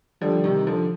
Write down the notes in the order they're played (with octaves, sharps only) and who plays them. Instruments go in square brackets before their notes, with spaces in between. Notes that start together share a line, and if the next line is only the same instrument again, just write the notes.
[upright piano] D3 F3 [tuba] G3
[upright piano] C3 D#3
D3 F3